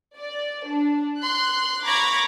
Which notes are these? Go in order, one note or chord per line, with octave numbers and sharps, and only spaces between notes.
D5
D4
C6 F#6
A#5 B5 C#6 D6 G#6 A#6